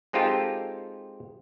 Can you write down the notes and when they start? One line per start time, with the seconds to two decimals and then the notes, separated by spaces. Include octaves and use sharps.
0.13 G#3 C4 D#4 F4 G4 A4